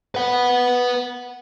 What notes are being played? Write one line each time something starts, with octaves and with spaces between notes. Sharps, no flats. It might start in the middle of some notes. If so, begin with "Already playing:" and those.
B4 F#5